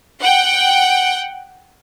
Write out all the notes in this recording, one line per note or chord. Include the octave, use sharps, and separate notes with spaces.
F#5 G5